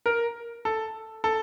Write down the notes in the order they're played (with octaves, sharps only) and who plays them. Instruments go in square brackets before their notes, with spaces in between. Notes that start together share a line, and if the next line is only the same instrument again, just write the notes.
[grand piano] A#4
A4
A4